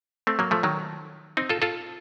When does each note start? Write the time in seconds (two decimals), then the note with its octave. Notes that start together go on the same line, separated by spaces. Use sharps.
0.27 A3 C4
0.39 F#3 A#3
0.51 F3 A3
0.63 D#3 F#3
1.37 C4 D#4
1.49 F4 A4
1.62 F4 A4